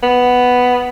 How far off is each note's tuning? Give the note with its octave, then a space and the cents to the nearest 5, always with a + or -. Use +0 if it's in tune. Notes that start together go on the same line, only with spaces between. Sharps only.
B3 +5